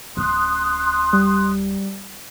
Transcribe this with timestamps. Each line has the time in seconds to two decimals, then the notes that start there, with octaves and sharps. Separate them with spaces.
0.17 D1 C#4 C6 D#6 F#6
1.13 G3